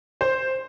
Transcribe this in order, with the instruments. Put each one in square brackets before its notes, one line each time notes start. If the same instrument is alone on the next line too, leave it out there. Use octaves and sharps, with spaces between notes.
[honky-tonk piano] C5